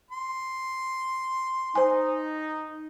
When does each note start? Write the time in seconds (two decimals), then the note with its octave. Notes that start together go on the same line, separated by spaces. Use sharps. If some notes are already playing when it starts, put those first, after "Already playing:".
0.11 C6
1.75 D#4 C5 G#5